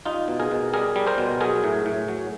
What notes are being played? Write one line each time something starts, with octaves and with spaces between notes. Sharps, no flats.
G3 D#4 F4
B2
G#4 A#4
B2
G3 G#4 A#4
G3
A#4 C5
B2
F#3 G#4 A#4
A2
A2
F#3